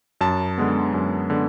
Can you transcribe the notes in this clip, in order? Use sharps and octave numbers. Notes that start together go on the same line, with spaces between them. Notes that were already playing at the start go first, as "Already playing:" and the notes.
F#2 A5
D3 G#3 B3
F#2
D3 G#3 B3